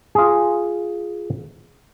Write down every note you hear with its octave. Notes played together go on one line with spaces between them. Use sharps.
F4 G#4